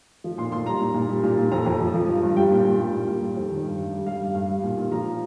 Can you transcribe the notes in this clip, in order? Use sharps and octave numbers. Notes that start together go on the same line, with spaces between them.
F3
A#2 C6
A#2 C6
G3 A#5
A#2
A#2
G3
A#2
A#2
F2 A#5
F2
F3
F3
G2
G2
G3 G5
A#2
A#2
G3
A#2
A#2
G3
F2
D#3
G2
G2
G3
G3 F5
G2
G2
G3
A#2
A#2
F3 A#5